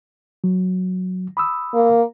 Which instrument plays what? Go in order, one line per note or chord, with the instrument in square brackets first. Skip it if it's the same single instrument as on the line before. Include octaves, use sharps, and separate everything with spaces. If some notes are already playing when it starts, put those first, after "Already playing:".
[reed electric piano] F#3
B5 D#6 E6
[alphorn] A#3